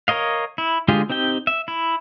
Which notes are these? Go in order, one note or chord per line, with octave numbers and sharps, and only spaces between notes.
A#4 C#5 D#5 F5
E4
D3 G#3 F4 G4 G#4
C4 D#4 G4 G5
E5
E4